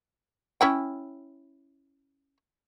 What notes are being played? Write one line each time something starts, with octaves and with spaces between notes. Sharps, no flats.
C#4 E4 G5